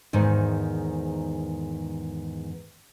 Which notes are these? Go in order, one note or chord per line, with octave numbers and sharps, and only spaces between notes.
E2 G#2 D#3